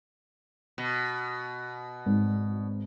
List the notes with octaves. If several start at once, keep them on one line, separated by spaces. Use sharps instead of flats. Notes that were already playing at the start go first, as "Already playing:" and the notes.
B2
G#1 G#2